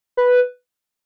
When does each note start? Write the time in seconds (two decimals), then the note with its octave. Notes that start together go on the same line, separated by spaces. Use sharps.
0.17 B4